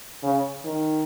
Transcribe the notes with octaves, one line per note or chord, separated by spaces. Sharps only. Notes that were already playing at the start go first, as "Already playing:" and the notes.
C#3
D#3